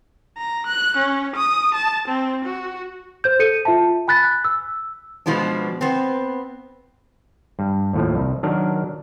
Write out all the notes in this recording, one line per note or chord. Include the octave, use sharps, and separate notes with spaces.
A#5
F#6
C#4
D#6
A5
C4
F#4
C5 G6
A4 C#7 D#7
F4 E5 A5
G#5 B5 F#6 A6 B6
E6
B2 F3 G#3 B3 D4
B3 C4
G2
D#2 A2 F3
C2
D#3 F#3 D4 A#4